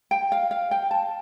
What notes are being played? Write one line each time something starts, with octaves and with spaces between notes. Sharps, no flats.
G5
F5
F5
G5
A5